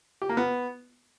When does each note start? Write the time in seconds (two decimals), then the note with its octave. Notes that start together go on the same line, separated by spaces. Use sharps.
0.22 G4
0.29 A#3
0.37 B3